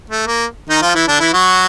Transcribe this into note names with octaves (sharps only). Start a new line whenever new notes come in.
A3
A#3
D#3 D#4
F3 F4
E3 E4
D3 D4
E3 E4
F#3 F#4